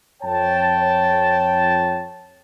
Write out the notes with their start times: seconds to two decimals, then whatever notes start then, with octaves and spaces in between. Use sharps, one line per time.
0.23 F2 C#5 G5 A5